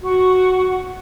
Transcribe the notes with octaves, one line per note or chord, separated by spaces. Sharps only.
F#4 C#6